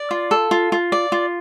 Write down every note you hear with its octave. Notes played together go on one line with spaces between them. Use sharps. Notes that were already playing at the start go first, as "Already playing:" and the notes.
Already playing: D5
F4
A4
F4
F4
D5
F4